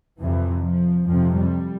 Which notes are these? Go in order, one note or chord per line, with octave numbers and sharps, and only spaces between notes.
F2 C3 E3
F3
F2 C3 F3
G3